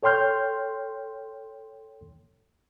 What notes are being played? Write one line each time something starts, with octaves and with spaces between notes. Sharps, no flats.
A4 C#5 G5 C6 F6 G6